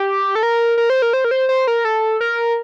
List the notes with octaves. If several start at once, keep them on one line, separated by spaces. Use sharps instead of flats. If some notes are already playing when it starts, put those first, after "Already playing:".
Already playing: G4
A4
A#4
A#4
C5
A#4
C5
A#4
C5
C5
A#4
A4
A#4